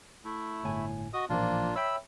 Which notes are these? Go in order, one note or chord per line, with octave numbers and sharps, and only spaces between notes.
A3 E4
G1 A2 G#5
F#4 D#5 D#6
A1 A#2 F3 A#3 D4 F4
C#5 E5 G5 B5 E6